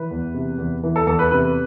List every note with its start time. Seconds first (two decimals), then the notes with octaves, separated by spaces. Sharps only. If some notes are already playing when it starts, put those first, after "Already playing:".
Already playing: E3 B4
0.11 E2
0.34 C3
0.58 E2
0.83 E3
0.96 A4
1.07 E2 A4
1.19 B4
1.31 C3 B4